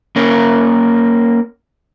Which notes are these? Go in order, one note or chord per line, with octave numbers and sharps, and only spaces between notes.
A#3 C#4 A#4